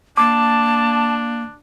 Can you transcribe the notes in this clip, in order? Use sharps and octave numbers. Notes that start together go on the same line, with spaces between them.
A#3 D4 A5 D6